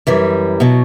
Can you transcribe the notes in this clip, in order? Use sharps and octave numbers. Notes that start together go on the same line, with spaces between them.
F#2 E3 G3
B2 F#3